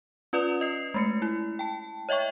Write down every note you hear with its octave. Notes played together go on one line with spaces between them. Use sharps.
C#4 F4 B4 D5 D#6 F7
D#5 C7
G#3 A3 C#7
E4
G5 A5
C#5 D#5 E5 G5 C#6